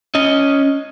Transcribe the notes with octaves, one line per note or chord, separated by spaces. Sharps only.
C#4 D#5